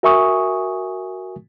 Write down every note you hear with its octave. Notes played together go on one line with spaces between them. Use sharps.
F#4 A#4 E5 G#5 C#6 D#6